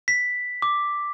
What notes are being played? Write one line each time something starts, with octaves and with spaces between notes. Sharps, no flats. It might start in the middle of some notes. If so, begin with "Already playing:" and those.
B6
D6